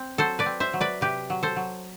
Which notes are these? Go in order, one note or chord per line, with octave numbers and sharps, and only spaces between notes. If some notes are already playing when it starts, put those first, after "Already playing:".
Already playing: C4
F#3 A4 C5
B4 D5
C4
C5 E5
F#3
B4 D5
C3 G4 B4
F#3
A4 C5
F#3